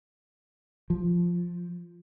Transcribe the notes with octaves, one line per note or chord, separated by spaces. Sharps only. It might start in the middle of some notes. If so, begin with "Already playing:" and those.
F3